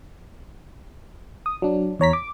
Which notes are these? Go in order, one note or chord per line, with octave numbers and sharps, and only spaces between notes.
D#6
F#3 D4
E2 C#5 A#5 B6
D6